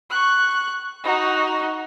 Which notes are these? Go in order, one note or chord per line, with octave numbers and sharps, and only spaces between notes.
C#6 F#6
D#4 F#4